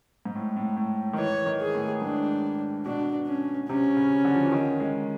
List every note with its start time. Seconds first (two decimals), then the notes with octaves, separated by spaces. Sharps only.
0.25 G#2
0.35 A2
0.56 A2
0.77 A2
1.13 D#3
1.18 E3 C#5
1.46 D#3
1.61 G#4
1.75 A2
2.02 G#2 D4
2.86 B2 D4
3.27 C#4
3.69 C3 C#4
3.97 C#3
4.25 D3
4.35 F3
4.43 E3
4.52 D#3
4.80 G#3